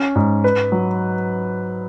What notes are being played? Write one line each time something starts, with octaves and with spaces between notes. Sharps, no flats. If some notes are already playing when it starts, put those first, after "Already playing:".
Already playing: C#4
G#2
B4
F#3